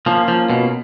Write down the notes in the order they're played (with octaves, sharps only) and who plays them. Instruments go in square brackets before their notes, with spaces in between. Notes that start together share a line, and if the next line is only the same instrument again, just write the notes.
[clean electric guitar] F3 [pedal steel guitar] A#3 C#4 F4
[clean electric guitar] F3
B2